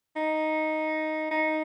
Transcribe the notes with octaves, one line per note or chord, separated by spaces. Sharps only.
D#4
D#4